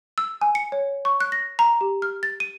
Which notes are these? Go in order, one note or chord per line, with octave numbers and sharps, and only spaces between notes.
E6
G#5
C#7
C#5
C#6
F#6
A#6
A#5
G4
F6
A6
D#7